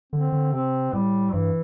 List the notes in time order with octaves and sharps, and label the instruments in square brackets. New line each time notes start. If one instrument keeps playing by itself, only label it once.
[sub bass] D3 [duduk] C4
[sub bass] D3
[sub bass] C3 [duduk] C4
[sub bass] A2 [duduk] G3
[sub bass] G2 [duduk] E3